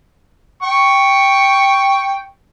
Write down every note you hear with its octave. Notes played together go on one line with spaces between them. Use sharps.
G5 C#6